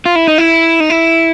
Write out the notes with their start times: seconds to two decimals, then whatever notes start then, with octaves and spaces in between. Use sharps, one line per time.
0.06 F4
0.16 E4
0.27 D#4
0.38 E4
0.80 D#4
0.90 E4